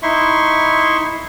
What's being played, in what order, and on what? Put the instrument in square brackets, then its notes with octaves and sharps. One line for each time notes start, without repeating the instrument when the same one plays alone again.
[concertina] D#4 E4 E5 C6 C#6